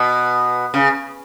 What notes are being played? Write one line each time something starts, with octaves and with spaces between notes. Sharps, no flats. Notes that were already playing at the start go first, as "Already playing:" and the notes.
Already playing: B2
C#3